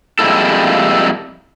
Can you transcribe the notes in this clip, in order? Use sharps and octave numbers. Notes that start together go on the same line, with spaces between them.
F2 G3 G#3 A#3 E4 A4